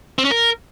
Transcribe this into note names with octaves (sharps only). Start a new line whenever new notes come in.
C4
C#4
A#4